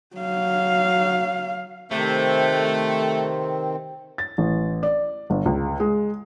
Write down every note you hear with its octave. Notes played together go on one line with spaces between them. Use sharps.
F#3 F5
C3 D#3 A3 C4
A6
A1
D5
G1
C#2
G#3